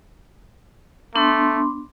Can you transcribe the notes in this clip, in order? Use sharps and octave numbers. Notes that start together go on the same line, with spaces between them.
A3 B3 D4 C6